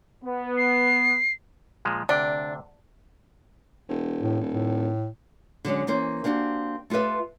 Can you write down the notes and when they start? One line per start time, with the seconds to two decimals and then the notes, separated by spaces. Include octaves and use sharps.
0.24 B3
0.57 C7
1.85 A#2 F3 G#3
2.09 D2 C3 D4 G5
3.89 E1
4.22 A2
4.40 D#1
4.53 A2
5.65 D3 F#3 G#3 C#4
5.87 E3 A#3 C#4 C5
6.24 A#3 C4 D4 F#4 G4
6.90 A3 F4 G4 B4 E5